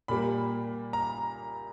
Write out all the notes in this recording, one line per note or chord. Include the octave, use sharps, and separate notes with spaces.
A#2 G3 A#3 B5
A#5